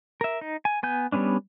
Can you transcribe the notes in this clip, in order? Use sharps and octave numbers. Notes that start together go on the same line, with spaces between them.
A#4 E5
D#4
G#5
B3 G#5 G6
G3 A#3 B3 C#4 D4